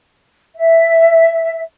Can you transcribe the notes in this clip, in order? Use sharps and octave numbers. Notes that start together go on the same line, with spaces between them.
E5